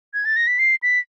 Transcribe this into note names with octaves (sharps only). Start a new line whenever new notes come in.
G#6
A6
A#6
B6
C7
B6